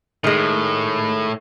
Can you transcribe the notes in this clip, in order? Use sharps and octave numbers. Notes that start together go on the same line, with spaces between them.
A2 D#3 G#3